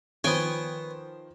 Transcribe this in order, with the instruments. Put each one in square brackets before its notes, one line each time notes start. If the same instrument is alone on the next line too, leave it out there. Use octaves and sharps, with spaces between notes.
[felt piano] D#3 F3 C5 [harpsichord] B3 C#5 [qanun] G5 G#5